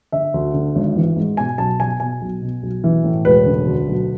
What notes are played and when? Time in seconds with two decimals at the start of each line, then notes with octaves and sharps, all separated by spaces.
0.12 D3 E5
0.34 D2
0.54 D3
0.75 G#1
0.96 E3
1.16 G#2
1.37 B2 G#5
1.58 B1 A5
1.80 B2 G#5
2.00 B2 G#5
2.21 B1
2.42 B2
2.63 B1
2.84 E3
3.04 A2
3.25 E1 B4
3.46 D3
3.67 D2
3.88 B1